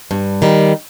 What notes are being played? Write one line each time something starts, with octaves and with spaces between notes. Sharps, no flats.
G2
D#3 G3